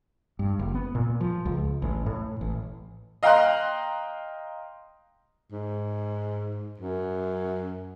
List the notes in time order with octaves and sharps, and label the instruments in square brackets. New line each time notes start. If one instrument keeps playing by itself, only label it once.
[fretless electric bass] G2
F#1
B3
A#2
F3
C#2
A1
A2
A1
[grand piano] D#5 F5 G5 A#5 C6 F#6
[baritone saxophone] G#2
F#2